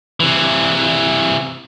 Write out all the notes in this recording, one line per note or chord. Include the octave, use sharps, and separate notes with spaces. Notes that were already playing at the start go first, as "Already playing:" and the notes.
C3 E3